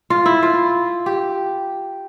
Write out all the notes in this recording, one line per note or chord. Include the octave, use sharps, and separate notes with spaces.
F4
E4
F4
G4